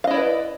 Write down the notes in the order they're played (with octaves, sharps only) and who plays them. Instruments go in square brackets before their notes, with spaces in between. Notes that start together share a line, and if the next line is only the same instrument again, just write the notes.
[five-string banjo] F5
D#5
E4
D5
B4